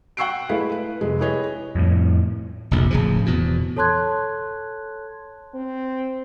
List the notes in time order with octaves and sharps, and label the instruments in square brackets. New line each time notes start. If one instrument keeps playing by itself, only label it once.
[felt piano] F#5 G5 C#6 E6 C7 D7
G#3 A3 E4 B4 D#5 F5
B4
F1 G#3
E4 G4 G#4 B4 C#5 D#5
[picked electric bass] F2 A2
[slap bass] F1 A#1
D1 C#3 F3
E2 B2
[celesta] A4 C#5 A5 C6 F#6 G#6
[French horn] C4